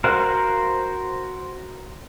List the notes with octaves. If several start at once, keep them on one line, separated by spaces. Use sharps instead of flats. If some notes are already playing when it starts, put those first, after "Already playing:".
F#4 A#4 C5 F5 F#5